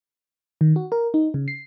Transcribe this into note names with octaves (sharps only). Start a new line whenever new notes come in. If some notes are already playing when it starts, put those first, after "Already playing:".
D#3
F#4
A#4
D#4
C#3
C7